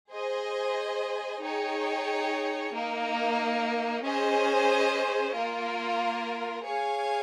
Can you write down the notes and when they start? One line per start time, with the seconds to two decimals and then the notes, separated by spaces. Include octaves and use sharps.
0.11 G#4 C5 D#5 G#5
1.42 D#4 G#4 C#5 G5
2.73 A#3 D#4 A#4
4.03 C#4 G#4 C5 D#5 G#5
5.35 A#3 F4 A#4
6.65 G#4 C#5 F5 G#5